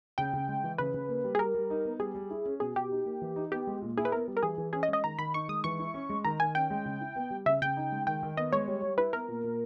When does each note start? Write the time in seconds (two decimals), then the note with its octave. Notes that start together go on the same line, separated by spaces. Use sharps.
0.18 C#3 G5
0.33 C#3
0.48 G#3
0.64 E3
0.78 C#3 B4
0.94 C#3
1.09 A#3
1.24 G3
1.35 G#4
1.39 G3 A#4
1.54 G3
1.70 D#4
1.85 B3
2.00 G3 G#4
2.15 G3
2.30 E4
2.46 C#4
2.60 B2 G#4
2.76 B2 G4
2.92 D#4
3.06 A#3
3.22 E3
3.36 D#4
3.52 B3 G4
3.67 G#3
3.82 A#2
3.97 E4 G#4
4.05 B4
4.12 B3 A#4
4.28 G3
4.37 A#4
4.42 E3 G#4
4.58 E3
4.73 C#4 G#4
4.83 D#5
4.88 G#3
4.93 D#5
5.04 D#3 A#5
5.18 D#3 B5
5.34 D#4 C#6
5.48 G#3 D#6
5.64 E3 C#6
5.79 E4
5.94 C#4
6.09 G#3
6.24 D#3 A#5
6.40 D#3 G#5
6.55 C#4 G5
6.70 G#3
6.86 C#3
7.01 E4
7.16 B3
7.31 G3
7.46 C#3 E5
7.62 C#3 G5
7.77 D#4
7.92 G#3
8.07 D#3 G5
8.23 D#3
8.37 B3 D#5
8.52 G#3 C#5
8.68 G3
8.83 G3
8.98 E4 B4
9.13 B3 A#4
9.28 A#2
9.44 A#2